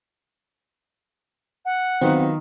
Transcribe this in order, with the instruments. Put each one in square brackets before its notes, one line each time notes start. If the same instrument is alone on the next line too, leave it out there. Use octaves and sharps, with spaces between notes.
[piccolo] F#5
[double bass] D#3 [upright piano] F#3 B3 F4 [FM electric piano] C4